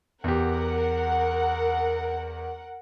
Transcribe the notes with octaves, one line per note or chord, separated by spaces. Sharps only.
E2 G4 A#4 F#5